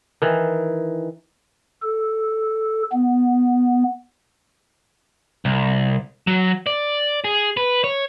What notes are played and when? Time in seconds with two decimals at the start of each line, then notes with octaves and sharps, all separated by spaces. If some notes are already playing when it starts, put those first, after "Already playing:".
0.22 D#3 E3
1.82 A4
2.92 B3
5.45 C2
6.27 F#3
6.67 D5
7.24 G#4
7.57 B4
7.84 C#5